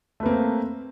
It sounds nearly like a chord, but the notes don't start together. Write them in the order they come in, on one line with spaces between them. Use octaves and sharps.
A3 B4 A#3 C4